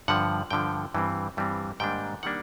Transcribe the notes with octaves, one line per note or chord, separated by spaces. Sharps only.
G2 D3 F3 F#5
G2 D3 F3 G5
G2 E3 G3 C4
G2 E3 G3 C4
G#2 D#3 G3 A#3 D4 G5
D#3 G3 A#3 D4 F#5